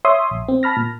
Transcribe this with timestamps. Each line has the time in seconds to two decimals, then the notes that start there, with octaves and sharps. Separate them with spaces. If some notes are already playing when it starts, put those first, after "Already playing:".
0.05 C#5 E5 C6 D#6
0.31 A#1
0.48 C4
0.63 A5 B5 F6 A#6
0.77 A#2